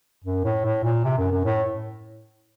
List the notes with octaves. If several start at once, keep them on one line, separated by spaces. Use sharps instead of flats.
F#2
A2
A2
A#2
C3
F#2
F#2
A2